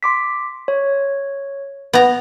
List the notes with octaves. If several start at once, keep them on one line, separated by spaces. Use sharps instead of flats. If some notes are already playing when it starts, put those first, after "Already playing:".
C6 D6 B6
C#5
B3 A#5